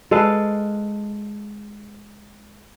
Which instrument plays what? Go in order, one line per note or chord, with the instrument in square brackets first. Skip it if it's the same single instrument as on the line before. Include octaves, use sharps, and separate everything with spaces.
[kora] G#3 A4 B4 F5